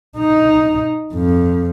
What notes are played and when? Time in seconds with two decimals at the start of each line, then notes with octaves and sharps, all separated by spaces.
0.18 D#4
1.14 F2